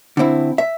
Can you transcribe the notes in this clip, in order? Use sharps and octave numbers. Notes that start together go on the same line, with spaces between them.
D3 C4 E4
E5